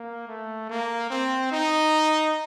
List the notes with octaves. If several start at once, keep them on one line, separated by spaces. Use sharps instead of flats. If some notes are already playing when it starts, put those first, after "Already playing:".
Already playing: A#3
A3
A#3
C4
D#4